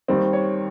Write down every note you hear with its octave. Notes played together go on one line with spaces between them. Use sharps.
D#2 D#3 G3 C4
C#5